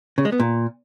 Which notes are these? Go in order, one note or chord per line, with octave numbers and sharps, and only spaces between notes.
C#3
G#3
B3
A#2